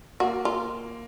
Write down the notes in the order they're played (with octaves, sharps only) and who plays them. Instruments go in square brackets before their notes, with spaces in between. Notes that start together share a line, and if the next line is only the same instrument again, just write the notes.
[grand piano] A#3 [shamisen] F#4
[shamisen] F4